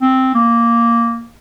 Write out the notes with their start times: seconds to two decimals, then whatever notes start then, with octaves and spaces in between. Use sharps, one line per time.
0.02 C4
0.35 A#3